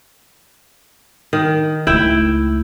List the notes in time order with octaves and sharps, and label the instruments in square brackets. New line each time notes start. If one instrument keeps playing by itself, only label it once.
[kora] D#3
[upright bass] C#2 A3 [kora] E4 G5